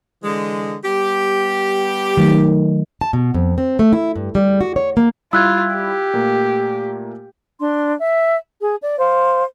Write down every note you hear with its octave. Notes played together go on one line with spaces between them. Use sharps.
D3 E3 G#3
G3 B3 G4
D#3 F#3 A3
A5
B2
F2
C4
A3
E4
G2
G3
F#4
C#5
A#3
G3 E4 F4 B5 E6 F#6 G#6
G4
A#2 A3 A#3
D4 C6
E5
G#4
D5
C5 F5